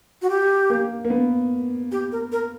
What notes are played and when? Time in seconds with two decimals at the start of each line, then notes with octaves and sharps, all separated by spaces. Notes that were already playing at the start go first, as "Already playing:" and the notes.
0.22 F#4
0.30 G4
0.70 A#3
1.05 A#3
1.10 B3
1.92 G4
2.12 A#4
2.32 A#4